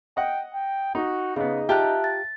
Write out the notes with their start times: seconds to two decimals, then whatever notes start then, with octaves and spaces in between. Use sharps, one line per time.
0.17 D#5 F#5 G5
0.54 G5
0.95 D#4 F#4
1.36 C#3 B3 D#4 G#4
1.69 F4 G4 E5 G5 A5 A#5 F#6
2.04 A6